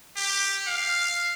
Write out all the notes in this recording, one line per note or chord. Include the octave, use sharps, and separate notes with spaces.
G4
F5